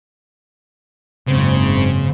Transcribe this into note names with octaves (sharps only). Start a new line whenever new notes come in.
F#1 G#2 C#3 C4